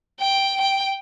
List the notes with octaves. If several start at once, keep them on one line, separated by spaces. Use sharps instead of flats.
G5
G5